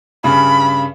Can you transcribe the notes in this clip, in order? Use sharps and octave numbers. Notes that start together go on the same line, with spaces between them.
G2 C#3 B5